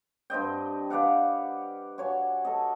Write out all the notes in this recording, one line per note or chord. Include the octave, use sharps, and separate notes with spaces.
G2 C4 D#5 G5
B4 D5 F5 F#5
F#4 C#5 G#5
A4 D#5